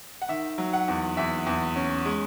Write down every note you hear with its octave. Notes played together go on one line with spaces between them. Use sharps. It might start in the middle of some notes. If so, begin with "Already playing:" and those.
F#5
D#3 E5
F#3
F#5
E2
E2 E5
E2
C#4
G#3